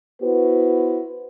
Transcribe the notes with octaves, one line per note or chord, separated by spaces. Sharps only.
B3 E4 F#4 B4 C5